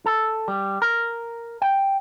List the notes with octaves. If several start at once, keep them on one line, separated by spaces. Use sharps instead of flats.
A4
G3
A#4
G5